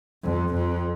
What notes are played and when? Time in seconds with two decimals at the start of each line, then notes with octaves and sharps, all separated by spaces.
0.23 F2
0.55 F2